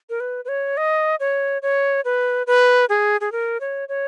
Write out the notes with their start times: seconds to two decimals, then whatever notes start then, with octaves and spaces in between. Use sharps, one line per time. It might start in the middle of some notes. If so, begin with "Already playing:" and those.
0.10 A#4
0.20 B4
0.45 B4
0.48 C#5
0.77 D#5
1.20 C#5
1.62 C#5
2.05 B4
2.47 B4
2.89 G#4
3.21 G#4
3.32 A#4
3.61 C#5
3.89 C#5